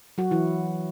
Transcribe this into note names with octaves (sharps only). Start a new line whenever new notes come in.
F#3 F#4
E3 E4